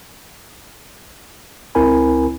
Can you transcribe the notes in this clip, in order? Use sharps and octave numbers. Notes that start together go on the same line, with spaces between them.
C#2 C4 E4 A#4 G#5 B5